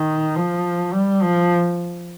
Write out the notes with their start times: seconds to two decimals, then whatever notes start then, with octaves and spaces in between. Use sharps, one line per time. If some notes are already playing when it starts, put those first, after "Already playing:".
Already playing: D#3
0.36 F3
0.93 G3
1.22 F3